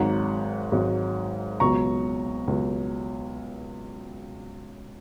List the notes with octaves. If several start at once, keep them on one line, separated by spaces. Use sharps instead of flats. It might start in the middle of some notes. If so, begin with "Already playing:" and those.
Already playing: G#1 G#2 F#3 F#5 A#5
G#1 G#2 F#3
C#2 B2 F#3 A#5 C#6
C#2 B2 F#3